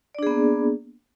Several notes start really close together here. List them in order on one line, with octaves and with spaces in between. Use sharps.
D5 D4 G#4 B3 A#3